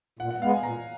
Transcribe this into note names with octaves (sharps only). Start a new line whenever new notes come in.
A#2 F#5
F#5
G#3 B3 F5
G#5
A#2 A#5